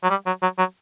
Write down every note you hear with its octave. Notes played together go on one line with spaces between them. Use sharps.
F#3
G3
F#3
F#3
F#3